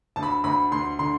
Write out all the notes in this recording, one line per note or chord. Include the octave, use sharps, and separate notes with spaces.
D2 A5
B5
D2 B5
D2 C6
D3 C6